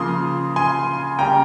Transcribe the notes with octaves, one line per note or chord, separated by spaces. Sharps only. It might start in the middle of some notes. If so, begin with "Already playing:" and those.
Already playing: C#3 F3 A#3 C6 D#6
G#5 C6
C#3 G3 A#3 G5 A#5